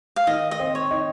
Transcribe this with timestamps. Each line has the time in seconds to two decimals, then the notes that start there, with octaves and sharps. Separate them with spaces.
0.16 F5
0.27 D#3 D#5
0.51 D#5
0.60 C4
0.75 C#5
0.91 D#4